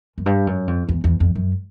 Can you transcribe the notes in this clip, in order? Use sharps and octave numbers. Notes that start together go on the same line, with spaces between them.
F#2
G2
F#2
F2
E2
E2
F2
F#2